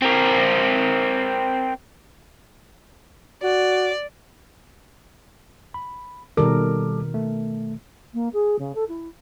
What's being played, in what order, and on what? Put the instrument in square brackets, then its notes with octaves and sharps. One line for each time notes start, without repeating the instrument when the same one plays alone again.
[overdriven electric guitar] C4 A#4
[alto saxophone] F#4 [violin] D5
[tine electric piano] B5
[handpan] B2 D#3 A#4 [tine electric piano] G3 A4 D6
[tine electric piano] A3
[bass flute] A#3
G#4
C#3
A4
E4